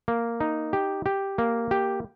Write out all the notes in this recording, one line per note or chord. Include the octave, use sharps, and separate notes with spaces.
A#3
D#4
G4
G4
A#3
G4